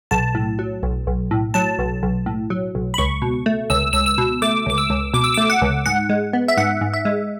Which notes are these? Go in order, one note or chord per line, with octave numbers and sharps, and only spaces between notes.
B1 A5
A2
F#3
B1
B1
A2
F#3 A5
B1
B1
A2
F#3
B1
B5
C#2 C#6
B2
A3
C#2 E6
C#2 E6
E6
B2
A3 D6
C#2 D6
E6
C#2
B2 D6
E6
A3 D6
F#5
C#2
G#2 F#5
G#3
B3
E5
G#2 F#5
G#2
E5
G#3